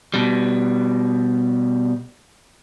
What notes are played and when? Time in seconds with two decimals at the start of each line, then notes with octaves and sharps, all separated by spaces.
0.14 B2 G3